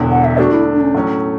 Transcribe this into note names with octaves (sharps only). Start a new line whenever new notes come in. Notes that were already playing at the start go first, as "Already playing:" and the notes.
Already playing: E1 E2 D3
F#5
E5
D3 A3 D4 F#4
E4
D4
C#4
A2 F#3 A3 C#4